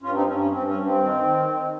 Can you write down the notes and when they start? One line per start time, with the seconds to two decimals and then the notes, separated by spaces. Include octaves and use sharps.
0.02 G2 C#4 F4
0.14 C4 D#4
0.27 G2 C#4
0.39 C#4
0.51 G2 C4
0.67 C#4
0.75 G2
0.83 C4
0.99 D#3
1.24 D#3
1.48 D#3